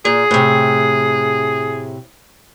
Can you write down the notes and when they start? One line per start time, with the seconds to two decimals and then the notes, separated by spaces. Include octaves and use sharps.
0.05 A#2 G#4
0.31 A2 C3